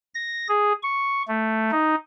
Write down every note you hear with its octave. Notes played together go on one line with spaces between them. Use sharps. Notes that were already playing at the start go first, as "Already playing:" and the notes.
A#6
G#4
C#6
A3
D#4